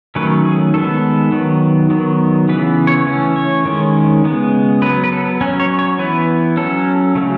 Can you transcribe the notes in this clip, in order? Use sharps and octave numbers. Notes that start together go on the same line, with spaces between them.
D#3 F#3 A3 C#4 B4
G#4
D#3 G#3 B3 A4
D#3 F#3 B3
D#3 F#3 B3
C#3 E3 B3 B4
C#5
E3 A3 C#4
C#5
D#3 G#3 C#4
C#3 G#3 B3
F#3 B3 B4
B4
A4
F#3 C#4
C#5
C#5
E3 B3 B4
F#3 C#4 A4
C#3 F#3 A3 C#4